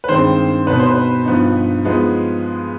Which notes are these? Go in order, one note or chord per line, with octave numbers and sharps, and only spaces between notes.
B4
G2 D#3 G#3 C4 C5
B2 B3 D#4 B4
C5
B4
G2 F3 B3 D#4
F3 G#3 B3 D#4